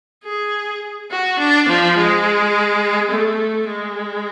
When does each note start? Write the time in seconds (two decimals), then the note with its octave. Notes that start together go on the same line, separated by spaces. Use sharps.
0.24 G#4
1.11 F#4
1.39 D4
1.68 F3
1.97 G#3
3.11 A3
3.67 G#3